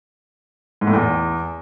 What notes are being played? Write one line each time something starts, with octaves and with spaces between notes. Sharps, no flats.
G#2
A2
E2